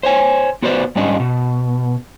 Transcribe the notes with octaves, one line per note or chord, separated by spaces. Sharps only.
C5 C#5 G#5
B3 F#4 B4 C5 D5
G#2 G3 C#4 D4 D#5
B2